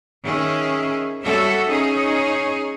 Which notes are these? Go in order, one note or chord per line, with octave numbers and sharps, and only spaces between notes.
D#3 C#4 G#4 E5
G3 F#4 A4 C#5 E5
C#4 D#4 G#4 C#5